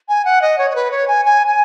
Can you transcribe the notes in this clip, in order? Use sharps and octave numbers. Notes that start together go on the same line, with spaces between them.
G#5
F#5
D#5
C#5
C#5
B4
C#5
G#5
G#5
G#5